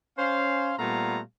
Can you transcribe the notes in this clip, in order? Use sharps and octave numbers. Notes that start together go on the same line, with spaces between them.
C#4 C5 F5
A#2 G3 A3 B3 F5 A#5